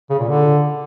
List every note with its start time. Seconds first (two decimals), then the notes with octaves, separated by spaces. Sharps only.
0.10 C#3
0.19 A#2
0.28 D3